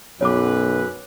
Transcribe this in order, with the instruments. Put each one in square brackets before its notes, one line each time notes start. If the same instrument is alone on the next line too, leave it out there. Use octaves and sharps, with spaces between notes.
[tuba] B1 [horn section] F#2 B4 [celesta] C#5 D6